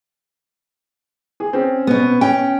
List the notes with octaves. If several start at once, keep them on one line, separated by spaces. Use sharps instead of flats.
G#4
C4 C#4
B2 B3
C#4 G5